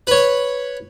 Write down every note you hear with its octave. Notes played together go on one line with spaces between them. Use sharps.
B4 C#5